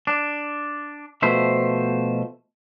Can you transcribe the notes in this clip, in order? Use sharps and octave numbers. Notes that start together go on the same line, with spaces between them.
D4
B2 F3 A3 C5 E5